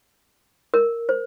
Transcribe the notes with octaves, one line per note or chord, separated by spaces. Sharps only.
A#4
C5